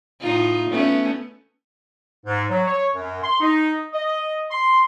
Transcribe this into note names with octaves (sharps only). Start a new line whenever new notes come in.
A2 D#4 F4
A3 B3 C#4
G#2
F#3
C#5
F#2
C6
D#4
D#5
C6